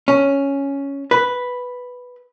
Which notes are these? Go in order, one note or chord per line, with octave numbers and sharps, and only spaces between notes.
C#4
B4